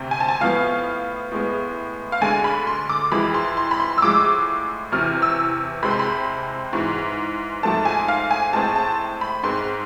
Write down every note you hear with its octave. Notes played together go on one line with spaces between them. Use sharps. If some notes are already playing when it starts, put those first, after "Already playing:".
Already playing: D2 C3 C4
G#5
A5
G#5
A2 F3 B3 F5
A2 G#3 B3
F5
D2 D3 G#3 G#5
B5
C6
D6
F2 E3 G#3 B5
C6
C6
B5
C6
E6
A2 F3 G#3 D6
E2 C3 E3 F6
E6
C2 C3 G#3 C4 B5
C6
B5
G#2 E3 G#3
G#2 F3 A3 C4 A5
G#5
F5
G#5
A2 G#3 C4 A5
A5
B5
G#2 G#3 C4 C6